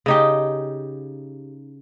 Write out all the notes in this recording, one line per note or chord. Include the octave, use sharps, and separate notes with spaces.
C#3 D#4 G4